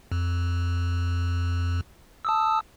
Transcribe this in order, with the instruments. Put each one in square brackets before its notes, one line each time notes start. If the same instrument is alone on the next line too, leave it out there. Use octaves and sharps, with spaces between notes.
[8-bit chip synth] F2
A5 D#6 E6